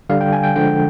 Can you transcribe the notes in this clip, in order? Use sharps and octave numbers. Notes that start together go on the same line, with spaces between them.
D3 G3 F5
G5
G#5
G5
D3 F3 G#3 G5